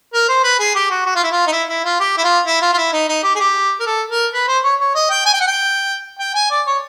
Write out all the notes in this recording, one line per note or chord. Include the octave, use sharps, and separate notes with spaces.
A#4
C5
B4
G#4
G4
F#4
F#4
F4
E4
F4
D#4
E4
E4
F4
G4
E4
F4
E4
F4
F4
E4
D#4
D#4
G4
G#4
G4
A#4
A4
A#4
B4
C5
C#5
C#5
D#5
G5
G#5
G5
F#5
G5
G5
G#5
D5
C#5